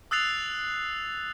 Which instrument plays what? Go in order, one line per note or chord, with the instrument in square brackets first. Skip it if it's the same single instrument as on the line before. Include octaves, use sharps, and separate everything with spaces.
[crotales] D#6 E6 F#6 A6 C7 F7